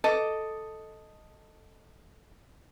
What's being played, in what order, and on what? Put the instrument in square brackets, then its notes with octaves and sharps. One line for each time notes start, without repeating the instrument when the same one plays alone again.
[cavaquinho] A4 D#5 D6